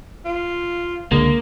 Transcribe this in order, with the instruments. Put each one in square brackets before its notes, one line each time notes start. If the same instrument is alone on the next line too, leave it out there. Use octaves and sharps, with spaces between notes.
[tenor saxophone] F4
[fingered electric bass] C#2 D3 [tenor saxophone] G#3 [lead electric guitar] A#3